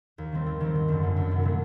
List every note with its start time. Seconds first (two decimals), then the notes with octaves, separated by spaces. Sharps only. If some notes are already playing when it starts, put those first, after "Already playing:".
0.18 D#2
0.32 D#3 G3 C4
0.46 D#2
0.61 D#3 G3 C4
0.75 G#1
0.88 F#2 D3
1.03 G#1
1.16 F#2 D3
1.31 C2
1.43 A#2 F#3 A3 D4